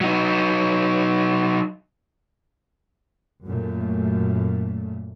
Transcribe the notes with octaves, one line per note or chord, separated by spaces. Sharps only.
F#3 D#4
F#2 A#2 A3